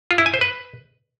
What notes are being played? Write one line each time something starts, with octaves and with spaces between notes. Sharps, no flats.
F4
E4
G#5
C5
B4